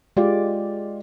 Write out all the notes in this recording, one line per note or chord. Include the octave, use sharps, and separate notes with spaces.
G#3 F4 G4 D5